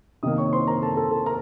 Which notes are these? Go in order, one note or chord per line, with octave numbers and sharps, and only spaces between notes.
C3 D#3 A#3 D#5 D#6
C#5 C#6
C5 C6
A#4 A#5
A4 A5
A4 A5
A4 A5
A#4 A#5